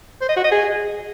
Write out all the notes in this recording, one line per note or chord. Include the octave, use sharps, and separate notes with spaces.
C5
D#5
F#4
D#5
G#4